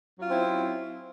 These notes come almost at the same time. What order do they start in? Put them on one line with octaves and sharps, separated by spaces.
F#3 F4 C#4 C4 E4